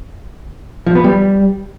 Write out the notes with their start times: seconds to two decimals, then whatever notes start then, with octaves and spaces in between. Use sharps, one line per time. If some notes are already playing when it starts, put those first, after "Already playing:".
0.86 F3
0.95 B3
1.04 G3